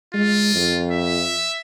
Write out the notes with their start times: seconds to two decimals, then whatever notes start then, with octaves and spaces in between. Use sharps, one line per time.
0.14 G#3 F4
0.55 F2
0.91 E5